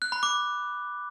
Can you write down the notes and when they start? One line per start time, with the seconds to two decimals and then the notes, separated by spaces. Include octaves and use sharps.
0.02 F#6
0.12 B5
0.23 D6